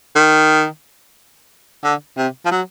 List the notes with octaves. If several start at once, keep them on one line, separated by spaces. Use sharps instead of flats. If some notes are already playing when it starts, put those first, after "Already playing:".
D#3
D3
C3
F3
F#3